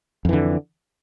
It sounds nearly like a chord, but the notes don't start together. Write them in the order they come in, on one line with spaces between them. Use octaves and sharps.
F2 E3 D3